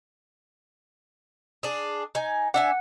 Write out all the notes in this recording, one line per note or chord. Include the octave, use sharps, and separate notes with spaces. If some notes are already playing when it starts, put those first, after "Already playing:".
D4 G#4
D#4 G#5
D4 E5 F#5 G#5